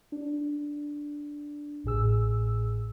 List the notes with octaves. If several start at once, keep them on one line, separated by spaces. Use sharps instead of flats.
D4
A1 A2 G#4 E6